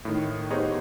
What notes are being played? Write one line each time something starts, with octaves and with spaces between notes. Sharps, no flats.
A2 D#3
B3 D#4 G4 G#4 C5 C#5